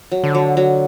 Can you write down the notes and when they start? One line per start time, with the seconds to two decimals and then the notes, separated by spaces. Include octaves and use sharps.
0.12 F#3
0.23 D3
0.35 F#3
0.57 F#3